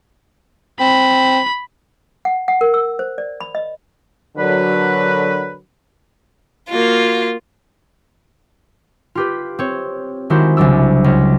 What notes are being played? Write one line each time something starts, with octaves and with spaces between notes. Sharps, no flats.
C4 B5
F#5
F#5
A#4
E6
C5
D5
B5
D#5
D3 F#3 D4 A#4 B4
A#3 F4 F#4
F4 G4 B4
C4 C#5
D#3 G#3 E4 F#4 G4 C5
C2 C#3 F#3 D4 E6
C#2